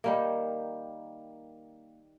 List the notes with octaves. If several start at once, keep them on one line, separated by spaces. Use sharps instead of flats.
D#3 G3 A#3